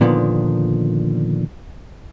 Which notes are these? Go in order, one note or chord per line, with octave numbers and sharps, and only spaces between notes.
A#2 D3 D#3 F3 B3